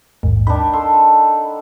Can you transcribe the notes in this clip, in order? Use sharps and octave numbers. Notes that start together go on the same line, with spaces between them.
A#1 D#2 G#2
D#3 D4 B5
A4 C6
F#5